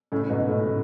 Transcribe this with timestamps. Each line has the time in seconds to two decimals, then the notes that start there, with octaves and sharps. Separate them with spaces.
0.12 A2 C#3
0.23 C#3
0.30 G#2 B2
0.48 A2 C#3
0.67 A2